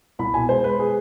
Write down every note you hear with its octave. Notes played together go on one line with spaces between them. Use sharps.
C2 B5
B2 G#5
G#3 C5
G#3 B4
G#4